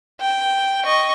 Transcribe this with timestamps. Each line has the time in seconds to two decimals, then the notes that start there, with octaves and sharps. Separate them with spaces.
0.20 G5
0.84 D#5 C#6